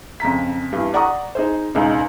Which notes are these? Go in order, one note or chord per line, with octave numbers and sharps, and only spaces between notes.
F2 C#3 A#5 B6
G2 E3
D5 F#5 A#5 C#6 D#6
D#4 G#4 C5
E1 C#2 D#4